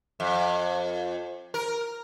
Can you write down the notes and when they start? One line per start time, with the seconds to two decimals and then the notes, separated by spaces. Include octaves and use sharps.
0.20 F2
1.54 A#4